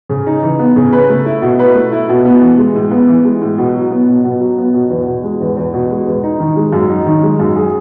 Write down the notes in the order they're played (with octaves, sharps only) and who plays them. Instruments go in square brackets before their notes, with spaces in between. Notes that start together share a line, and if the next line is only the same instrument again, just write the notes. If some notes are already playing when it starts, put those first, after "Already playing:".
[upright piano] C#3
D#4
E3
B3
C#3
B4
A3
E4
B2
B4
A3
E4
B2
B3
E3
G#3
A2
B3
E3
G#3
A2
B2
F#3
B3
B2
B2
F#3
B3
B2
E2
B2
G#3
E2
E2
B2
G#3
E2
D#4
D#3
G#3
F#2
D#4
D#3
G#3
F#2
G#4